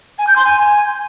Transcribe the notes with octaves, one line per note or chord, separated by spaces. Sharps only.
G#5
G6
C6
G#5